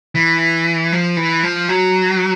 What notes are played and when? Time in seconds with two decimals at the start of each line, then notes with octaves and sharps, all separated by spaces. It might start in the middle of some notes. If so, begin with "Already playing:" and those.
0.15 E3
0.92 F3
1.17 E3
1.43 F3
1.69 F#3